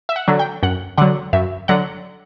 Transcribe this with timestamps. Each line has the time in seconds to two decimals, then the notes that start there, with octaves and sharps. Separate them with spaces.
0.09 E5
0.16 F#5
0.28 D3 F#3
0.39 G5
0.63 F#2 F#5
0.98 D3 F#3 F#5
1.33 F#2 E5
1.68 D3 F#3 F#5